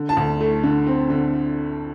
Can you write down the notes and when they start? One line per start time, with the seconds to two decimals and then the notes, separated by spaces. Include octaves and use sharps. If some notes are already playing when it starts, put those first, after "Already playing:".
Already playing: D3
0.09 A5
0.17 D2
0.41 A3
0.64 D3
0.87 C4
1.10 D3